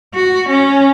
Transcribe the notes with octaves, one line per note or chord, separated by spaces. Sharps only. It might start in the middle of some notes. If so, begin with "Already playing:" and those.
F#4
C#4